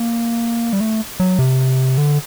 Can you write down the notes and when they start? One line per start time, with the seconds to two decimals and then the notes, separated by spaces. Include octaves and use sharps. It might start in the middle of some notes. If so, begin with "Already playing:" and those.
Already playing: A#3
0.73 G3
0.80 A3
1.20 F#3
1.39 C3
1.98 D3